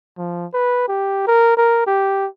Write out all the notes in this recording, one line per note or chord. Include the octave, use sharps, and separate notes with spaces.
F3
B4
G4
A#4
A#4
G4